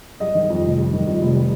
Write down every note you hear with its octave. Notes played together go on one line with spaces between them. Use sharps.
G3 D#5
D#3
F2
F1
G3
D#3
F2
F1
G3